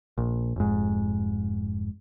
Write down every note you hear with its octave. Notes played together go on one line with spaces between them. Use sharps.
A#1
F1 G#2